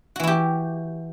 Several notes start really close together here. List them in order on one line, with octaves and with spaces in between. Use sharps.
F#4 E3 E4 G4